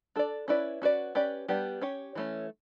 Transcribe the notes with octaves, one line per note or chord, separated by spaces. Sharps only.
D4 A4 D5
C#4 E4 B4 D5
C#4 F#4 B4 D5
C#4 G4 B4 D5
G3 B3 D4 G4
C#4 G4 C#5
E3 A3 C#4